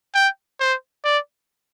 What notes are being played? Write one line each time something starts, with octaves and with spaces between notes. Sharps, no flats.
G5
C5
D5